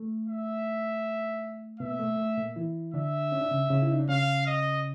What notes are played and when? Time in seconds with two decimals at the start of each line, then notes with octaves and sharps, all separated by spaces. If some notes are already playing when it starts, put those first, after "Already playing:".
Already playing: A3
0.28 E5
1.79 B2 B3 E5
1.91 A#3
2.00 A3
2.18 A3
2.37 A#2 A#3
2.56 E3 E4
2.94 D3 D4 E5
3.32 C#4
3.41 D4
3.51 C#3 C#4
3.70 C#3 C#4
3.82 E4
3.92 D#4
4.00 D4
4.08 C#3 C#4 F5
4.46 D#5